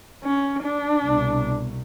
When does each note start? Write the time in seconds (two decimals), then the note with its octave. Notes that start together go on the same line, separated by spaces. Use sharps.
0.24 C#4
0.63 D4
1.04 C2 B2